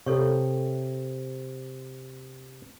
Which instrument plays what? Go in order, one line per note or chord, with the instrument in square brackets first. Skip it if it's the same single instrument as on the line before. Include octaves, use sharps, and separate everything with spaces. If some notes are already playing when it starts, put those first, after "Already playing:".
[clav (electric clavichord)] C3 [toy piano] A4 C#5 C#6